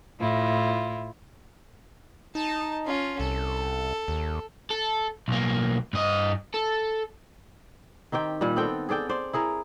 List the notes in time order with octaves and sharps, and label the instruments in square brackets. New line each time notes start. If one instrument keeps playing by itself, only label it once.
[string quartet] A2 E4 F4
[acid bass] D#4 [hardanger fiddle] A5
[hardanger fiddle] C#4 F4
[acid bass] C2 [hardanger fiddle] A4
[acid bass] D#2
[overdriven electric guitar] A4
B1 A#3
G2 D#5
A4
[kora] D#3 C4 G4 G5
A#2 G3
B3 C4 A4 G5
G#4 A4 D5 G5
C5 D5
E4 G#4 A#4